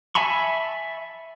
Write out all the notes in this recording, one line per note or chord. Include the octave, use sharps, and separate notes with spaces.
E5 G#5 A5 B5 C#6